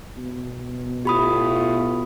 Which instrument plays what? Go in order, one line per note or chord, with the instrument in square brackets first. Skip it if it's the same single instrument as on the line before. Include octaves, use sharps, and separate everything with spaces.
[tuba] B2
[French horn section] A2 F4 [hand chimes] G4 B5 D#6